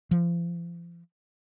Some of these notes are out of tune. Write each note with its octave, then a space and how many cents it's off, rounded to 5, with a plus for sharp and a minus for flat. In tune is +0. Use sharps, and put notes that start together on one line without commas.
F3 -35